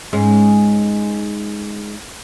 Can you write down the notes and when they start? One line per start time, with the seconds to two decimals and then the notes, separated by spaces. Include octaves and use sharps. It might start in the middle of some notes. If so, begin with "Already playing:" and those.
0.13 G#2 G#3 C#4